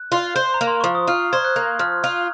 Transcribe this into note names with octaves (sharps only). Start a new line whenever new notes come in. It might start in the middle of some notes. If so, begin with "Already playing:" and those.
Already playing: F#6
F4
C5
A#5
A#3
C6
F3 C#6
D#6
F4 F6
C5 G#6
F#6
A#3
F3 F6
F4